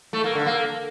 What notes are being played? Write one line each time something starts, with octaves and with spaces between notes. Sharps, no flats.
A3
A#3
D3
A#3